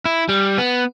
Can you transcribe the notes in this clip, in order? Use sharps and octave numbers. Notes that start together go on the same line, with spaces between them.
E4
G3
B3